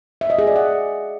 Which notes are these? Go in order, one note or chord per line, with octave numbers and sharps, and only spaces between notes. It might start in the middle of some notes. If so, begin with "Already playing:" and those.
E5
D#5
G#4
D5
F#5